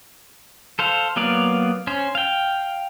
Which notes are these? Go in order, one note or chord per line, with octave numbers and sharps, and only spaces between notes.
A4 C5 F5
F#3 A#3 B3 D5 F5
C#4 C5
F5 G5